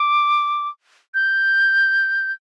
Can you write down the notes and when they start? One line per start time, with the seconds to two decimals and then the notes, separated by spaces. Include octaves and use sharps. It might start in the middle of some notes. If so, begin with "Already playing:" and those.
Already playing: D6
1.14 G6